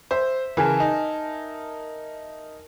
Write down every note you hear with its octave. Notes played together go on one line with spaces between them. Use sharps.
C5 E5
C#3 E3 A#4 G#5 A5
D#4